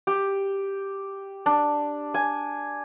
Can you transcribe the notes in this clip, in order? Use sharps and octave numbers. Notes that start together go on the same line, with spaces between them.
G4
D4
G#5